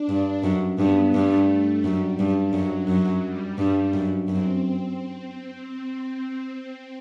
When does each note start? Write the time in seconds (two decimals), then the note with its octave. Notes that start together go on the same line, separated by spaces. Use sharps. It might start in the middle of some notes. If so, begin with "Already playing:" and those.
Already playing: D4
0.09 G2
0.44 F#2
0.79 G2 B3
1.13 G2 A3
1.83 F#2 G3
2.19 G2
2.53 F#2 F#3
2.88 F#2
3.24 G3
3.58 G2
3.94 F#2
4.28 F#2 C4